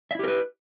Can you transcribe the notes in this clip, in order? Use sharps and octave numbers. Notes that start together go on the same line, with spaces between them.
E4 G4 A#4 B4 E5